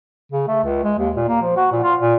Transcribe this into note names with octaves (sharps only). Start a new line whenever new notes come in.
C#3
A3
C#2
G#3
D#2
A#2
A#3
F3
F#4
A#2
F4
A#2